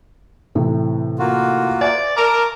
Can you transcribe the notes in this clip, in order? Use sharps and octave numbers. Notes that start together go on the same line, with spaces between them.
A2 C3 E3
A#3 F4 F#4
D5 E5 F5 G#5
A#4 A5 D6